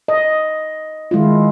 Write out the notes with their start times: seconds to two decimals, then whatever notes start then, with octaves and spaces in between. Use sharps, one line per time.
0.08 D#5
1.11 D#3 G#3 E4 F4